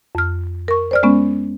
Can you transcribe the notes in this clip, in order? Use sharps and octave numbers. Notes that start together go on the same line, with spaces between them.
F2 F6
A#4 C#6
C5 D5 F6
G#3 B3 C#4